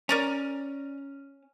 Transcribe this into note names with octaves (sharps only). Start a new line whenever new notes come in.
C#4 A#4 D5 A#5